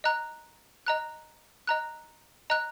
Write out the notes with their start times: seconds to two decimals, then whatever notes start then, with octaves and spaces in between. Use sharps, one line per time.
0.04 D#5 A#5 F#6
0.86 D#5 A#5 F#6
1.67 D#5 A#5 F#6
2.50 D#5 A#5 F#6